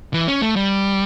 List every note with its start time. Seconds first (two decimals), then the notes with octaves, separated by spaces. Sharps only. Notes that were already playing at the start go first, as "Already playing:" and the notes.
0.14 E3
0.28 C#4
0.42 A3
0.56 G3